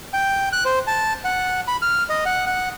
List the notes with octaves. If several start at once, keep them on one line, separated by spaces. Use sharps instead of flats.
G5
F#6
C5
A5
F#5
B5
F6
D#5
F#5
F#5